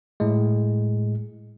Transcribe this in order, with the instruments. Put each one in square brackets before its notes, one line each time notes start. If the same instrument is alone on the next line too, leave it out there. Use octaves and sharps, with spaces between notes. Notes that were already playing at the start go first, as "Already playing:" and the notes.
[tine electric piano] A2 G#3